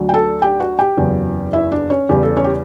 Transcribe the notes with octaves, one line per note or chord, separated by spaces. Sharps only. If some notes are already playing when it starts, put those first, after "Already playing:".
Already playing: D2 D3 F#3
G5
A4 A5
G4 G5
F#4 F#5
G4 G5
F#1 E2 C#3 F#3
E4 E5
D4 D5
C#4 C#5
E2 C#3 G3 G4
A4
C#4 C#5
G4